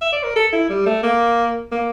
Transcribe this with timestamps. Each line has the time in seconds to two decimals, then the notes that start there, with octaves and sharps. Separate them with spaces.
0.02 E5
0.12 D5
0.24 A#4
0.36 A4
0.53 E4
0.70 G3
0.86 A3
1.03 A#3
1.72 A#3